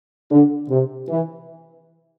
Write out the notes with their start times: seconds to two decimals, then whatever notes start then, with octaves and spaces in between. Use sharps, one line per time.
0.30 D3
0.69 C3
1.09 E3